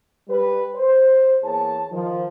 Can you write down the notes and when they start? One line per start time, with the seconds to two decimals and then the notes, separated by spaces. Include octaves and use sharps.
0.29 G3 B4
0.75 C5
1.43 E2 A#3 G#4 C#5 A5
1.91 D#3 F3